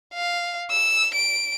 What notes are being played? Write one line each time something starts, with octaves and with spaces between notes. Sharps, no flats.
F5
E6
D7